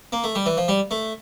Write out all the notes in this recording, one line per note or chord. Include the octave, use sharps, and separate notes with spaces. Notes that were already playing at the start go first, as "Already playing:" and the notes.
A#3
A3
G3
E3
F3
G3
A3